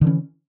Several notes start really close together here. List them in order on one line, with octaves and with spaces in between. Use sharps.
D3 E3 C#4